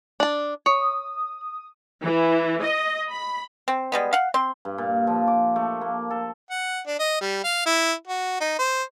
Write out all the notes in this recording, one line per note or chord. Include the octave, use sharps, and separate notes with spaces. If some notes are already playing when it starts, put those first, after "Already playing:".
D4 A5
C#5 D#6
E3
D#5
B5
C4
G3 G#3 B3
F5 F#5
C4 C6
G2
A#2
F3
D6
A3
A#3
A4
F#5
D4
D#5
G3
F5
E4
F#4
D#4
C5